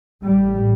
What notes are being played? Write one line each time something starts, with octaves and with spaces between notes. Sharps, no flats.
A1 A2 G3